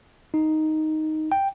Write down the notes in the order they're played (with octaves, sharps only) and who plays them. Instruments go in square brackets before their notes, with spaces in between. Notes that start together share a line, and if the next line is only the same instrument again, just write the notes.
[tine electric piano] D#4
G5